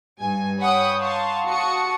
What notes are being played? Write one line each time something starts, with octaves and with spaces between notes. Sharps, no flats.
G2 G#5
C#5 F#5 G5 B5 C#6 D#6
F5 A5 C6 C#6
F#4 A5 C#6 D#6 C#7